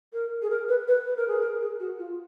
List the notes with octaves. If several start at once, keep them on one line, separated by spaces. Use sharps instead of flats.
A#4
G#4
A#4
B4
B4
B4
A#4
G#4
A#4
G#4
F#4
F4